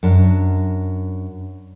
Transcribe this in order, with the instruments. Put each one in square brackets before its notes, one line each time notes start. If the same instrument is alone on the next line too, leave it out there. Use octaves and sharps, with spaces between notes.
[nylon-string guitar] F#2 D4